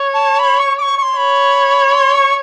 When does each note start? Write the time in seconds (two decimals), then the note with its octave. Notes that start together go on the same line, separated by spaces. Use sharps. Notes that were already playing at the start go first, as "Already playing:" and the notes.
Already playing: C#5
0.14 A5
0.39 B5
0.59 C#6
0.78 D6
0.82 C#6
0.97 C#6
1.02 C6
1.17 C#5 B5
1.95 C6
2.14 C#6